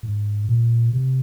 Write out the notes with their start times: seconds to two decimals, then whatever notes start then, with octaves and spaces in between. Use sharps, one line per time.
0.03 G#2
0.49 A#2
0.93 C3